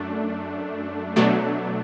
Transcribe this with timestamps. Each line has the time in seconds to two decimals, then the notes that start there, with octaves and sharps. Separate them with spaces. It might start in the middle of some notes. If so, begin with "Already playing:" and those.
Already playing: F#2 A3 D4
1.16 B2 F#3 A3 D4